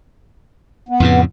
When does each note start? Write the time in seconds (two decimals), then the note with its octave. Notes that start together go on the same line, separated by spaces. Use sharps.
0.89 B3
1.00 F2 A2 C#3